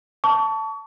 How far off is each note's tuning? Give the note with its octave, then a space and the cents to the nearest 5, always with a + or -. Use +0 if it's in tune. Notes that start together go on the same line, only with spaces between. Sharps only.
A5 +0 C#6 +35